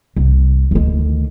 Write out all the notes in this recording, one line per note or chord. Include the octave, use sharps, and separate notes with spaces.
C2
D2 D#3